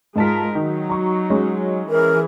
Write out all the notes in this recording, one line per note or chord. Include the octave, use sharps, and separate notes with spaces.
G#2 G#3 F4 A#4 A5 B6
D#3 F#3 D#4
A#5 C#6
G#3 C#4
E3 G#4 A#4